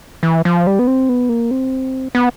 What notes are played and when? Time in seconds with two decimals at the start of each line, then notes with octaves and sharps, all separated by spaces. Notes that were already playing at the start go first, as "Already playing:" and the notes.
0.23 E3
0.45 F3
0.67 G3
0.79 B3
0.87 C4
1.09 B3
1.29 A#3
1.51 C4
2.15 B3